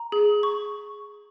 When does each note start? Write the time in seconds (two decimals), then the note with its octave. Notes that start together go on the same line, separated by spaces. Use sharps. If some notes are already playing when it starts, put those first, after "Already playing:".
Already playing: A#5
0.12 G#4
0.43 C#6